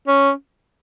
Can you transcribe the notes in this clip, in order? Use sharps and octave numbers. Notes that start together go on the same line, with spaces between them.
C#4